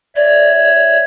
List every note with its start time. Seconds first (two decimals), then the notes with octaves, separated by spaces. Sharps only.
0.16 C#5 D5 E5 G#6